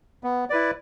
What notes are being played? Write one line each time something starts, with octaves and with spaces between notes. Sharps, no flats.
B3
E4 B4 D5